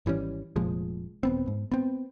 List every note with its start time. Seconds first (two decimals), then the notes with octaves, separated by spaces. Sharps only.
0.06 G#1 E3 G3 C#4
0.56 F1 A#2 F3 G#3
1.23 D#1 B3 C4
1.48 G#2
1.72 B3 C4